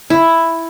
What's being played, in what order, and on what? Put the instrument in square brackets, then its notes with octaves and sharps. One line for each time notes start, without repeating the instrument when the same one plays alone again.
[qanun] E4